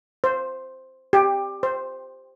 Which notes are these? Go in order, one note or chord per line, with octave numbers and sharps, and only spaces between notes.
C5
G4
C5